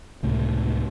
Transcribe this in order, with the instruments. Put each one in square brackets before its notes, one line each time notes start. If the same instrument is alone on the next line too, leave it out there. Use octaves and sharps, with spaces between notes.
[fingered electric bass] C#2 A2 C3